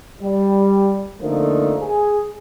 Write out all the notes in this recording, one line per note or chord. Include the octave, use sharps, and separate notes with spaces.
G3
F2 D3 F3 A3 A#3 D#4
G#4